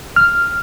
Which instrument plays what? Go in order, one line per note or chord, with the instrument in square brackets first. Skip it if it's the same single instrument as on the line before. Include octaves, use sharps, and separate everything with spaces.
[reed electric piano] F6